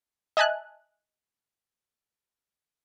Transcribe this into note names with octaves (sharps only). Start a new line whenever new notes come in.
D#5 E5 G#5 A5 F#6